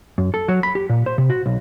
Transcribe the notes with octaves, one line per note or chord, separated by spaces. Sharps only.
F#2
A4
F#3
B5
G4
A#2
C5
C3
F#4
B1